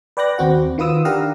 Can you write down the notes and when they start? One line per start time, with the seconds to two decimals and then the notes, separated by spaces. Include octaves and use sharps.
0.17 B4 D5 G5 D6 F#6 A#6
0.38 D#2 C4 F#4 F#5
0.78 D#3 F4 B4 D#6 E6
1.05 D4 G4 A#4 F5 F#5 A#5